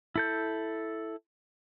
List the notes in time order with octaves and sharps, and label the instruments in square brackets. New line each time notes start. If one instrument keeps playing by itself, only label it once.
[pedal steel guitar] E4 A4 G6